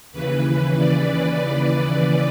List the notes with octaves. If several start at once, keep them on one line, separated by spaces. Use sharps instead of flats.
D#2 C#3 E3 B4
D5